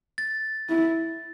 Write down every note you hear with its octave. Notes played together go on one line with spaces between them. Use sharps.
A6
E4